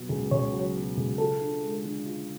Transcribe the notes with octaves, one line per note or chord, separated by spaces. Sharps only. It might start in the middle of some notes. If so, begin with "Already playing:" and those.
Already playing: B2 F#3
C#2
C#2 C#5
F#3
B2
C#2
F4 A4
D4
G#3
D3
F4